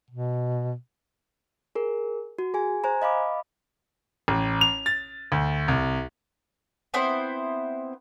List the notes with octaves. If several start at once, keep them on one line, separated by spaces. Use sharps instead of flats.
B2
G#4 A#4
F#4
G#4 G#5
C5 G#5 A#5
D#5 F5 B5 D6
A1
F7
A6
D2
C2
B3 C4 E4 C5